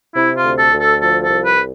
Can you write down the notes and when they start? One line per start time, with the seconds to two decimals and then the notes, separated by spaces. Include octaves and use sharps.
0.15 C3 E4
0.36 F4
0.44 D2
0.58 A4
0.73 D2
0.80 A4
1.01 F3 A4
1.23 A4
1.30 C2
1.45 B4